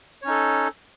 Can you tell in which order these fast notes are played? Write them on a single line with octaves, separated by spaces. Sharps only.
C#5 C#4 D#4 A4